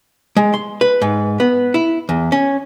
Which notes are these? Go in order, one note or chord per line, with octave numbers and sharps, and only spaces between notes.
G#3
C6
B4
G#2
B3
E4
E2
C#4